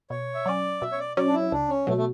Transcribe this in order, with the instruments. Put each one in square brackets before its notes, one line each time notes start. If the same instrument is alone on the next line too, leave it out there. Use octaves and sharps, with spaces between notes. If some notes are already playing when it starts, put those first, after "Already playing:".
[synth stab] B2 [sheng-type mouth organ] C#5
[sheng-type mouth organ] E5
[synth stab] F#3 C#4 [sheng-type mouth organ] D5
[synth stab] B2 [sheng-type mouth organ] E5
[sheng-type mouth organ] C#5
D5
[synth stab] F#3 C#4 [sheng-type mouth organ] D5
[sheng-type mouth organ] D4
E4
[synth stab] C#2 [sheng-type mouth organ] D4
[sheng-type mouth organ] C#4
[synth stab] B2 F#3 [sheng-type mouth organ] A3
[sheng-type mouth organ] A3